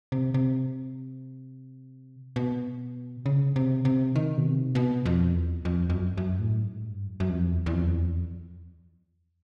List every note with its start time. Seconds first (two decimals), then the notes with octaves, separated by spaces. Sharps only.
0.12 C3
0.34 C3
2.36 B2
3.26 C#3
3.56 C3
3.85 C3
4.16 D#3
4.38 B2
4.46 C3
4.75 B2
5.06 F2
5.35 E2
5.65 F2
5.90 F2
5.95 F#2
6.17 F#2
6.39 A2
6.62 G#2
6.85 G2
7.07 F#2
7.20 F#2
7.29 F2
7.52 E2
7.59 F2
7.66 E2
7.73 F2
7.82 E2
7.89 F2
7.96 E2
8.03 F2
8.11 E2
8.18 F2